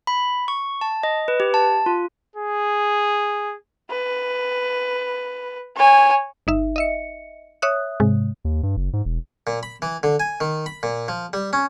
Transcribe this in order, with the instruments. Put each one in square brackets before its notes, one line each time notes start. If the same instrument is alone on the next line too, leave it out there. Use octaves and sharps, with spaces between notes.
[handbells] B5
C#6
A5
D#5
B4
G4
A5
F4
[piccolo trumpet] G#4
[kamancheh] B4
C#5 G#5
[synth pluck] G1 D#4 E5
D#5 E5 C#7
C#5 E5 D#6 F#6
G#2 C3 G#3
[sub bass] D#2
G2
F#1
G#2
E1
[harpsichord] A#2
B5
E3
D3
G#5
D#3
B5
A#2
F3
G3
C#4